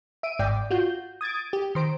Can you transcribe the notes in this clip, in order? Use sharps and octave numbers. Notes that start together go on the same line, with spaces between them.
E5 D7 D#7
G#1 G#2 D5 G5
F4 F#4 G6
D#6 G#6 A6 D7
G4
D#3 C5 D7